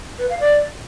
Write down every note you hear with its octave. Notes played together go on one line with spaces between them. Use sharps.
B4
F5
D5